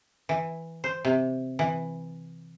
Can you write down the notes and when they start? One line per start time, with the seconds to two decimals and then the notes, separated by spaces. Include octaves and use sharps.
0.29 E3
0.84 C5
1.05 C3
1.59 E3